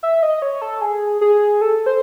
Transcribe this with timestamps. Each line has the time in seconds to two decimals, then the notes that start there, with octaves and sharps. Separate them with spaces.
0.03 E5
0.23 D#5
0.42 C#5
0.62 A4
0.81 G#4
1.21 G#4
1.61 A4
1.86 C5